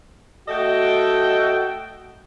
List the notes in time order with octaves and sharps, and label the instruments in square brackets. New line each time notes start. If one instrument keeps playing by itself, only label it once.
[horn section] A3 F#4 A4 D#5 G5